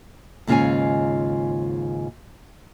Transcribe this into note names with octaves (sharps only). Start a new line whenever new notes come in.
D#2 G#2 C#3 F4 C#5 G#5